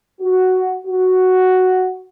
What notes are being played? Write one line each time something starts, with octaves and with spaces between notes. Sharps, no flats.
F#4
F#4